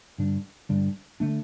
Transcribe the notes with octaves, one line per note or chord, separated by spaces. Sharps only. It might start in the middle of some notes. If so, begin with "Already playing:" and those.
G2 D3 G3 D4
G2 D3 G3 D4
D3 A3 D4